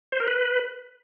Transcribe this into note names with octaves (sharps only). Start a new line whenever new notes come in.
C5
A#4
B4